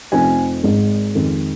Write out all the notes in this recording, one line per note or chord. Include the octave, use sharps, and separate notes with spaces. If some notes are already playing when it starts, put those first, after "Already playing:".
F1 F2 F3 C4 D#4 G#5
G#1 G#2 G#3 D#4
F2 D#3 G#3